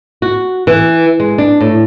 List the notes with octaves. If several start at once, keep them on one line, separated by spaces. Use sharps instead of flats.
F#4
E3
G#3
D4
A2